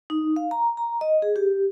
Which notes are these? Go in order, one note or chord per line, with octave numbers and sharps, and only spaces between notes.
D#4
F5
A#5
A#5
D#5
G#4
G4